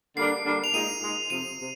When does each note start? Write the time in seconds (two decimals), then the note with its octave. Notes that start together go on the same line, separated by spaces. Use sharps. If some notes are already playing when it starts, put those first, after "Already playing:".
0.17 D3 G3 A#3 D4 C7
0.45 D3 G3 A#3 D4
0.64 F7
0.74 A#2 G#3 D#4 D#7
1.02 A#2 G#3 D#4
1.30 F2 C3 F3 C4 D#7
1.59 C3